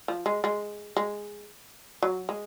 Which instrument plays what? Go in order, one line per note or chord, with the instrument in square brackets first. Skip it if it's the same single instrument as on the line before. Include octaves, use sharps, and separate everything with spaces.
[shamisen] F3
G#3
G#3
G#3
F#3
G#3